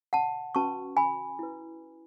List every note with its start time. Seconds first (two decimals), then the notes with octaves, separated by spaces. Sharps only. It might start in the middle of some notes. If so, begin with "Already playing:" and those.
0.13 F#5 A5
0.55 C#4 F#4 B4 A5 C#6
0.97 G#5 B5
1.39 E4 B4